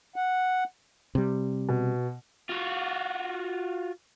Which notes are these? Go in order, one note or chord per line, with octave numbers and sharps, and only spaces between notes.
F#5
C3 G3
B2
F4 F#4